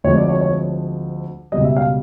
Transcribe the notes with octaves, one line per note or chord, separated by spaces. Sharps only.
D2 D3 F3 G#3 C4 C#5
D5
C#5
C#5
C#2 B2 G3 D#5
E5
F5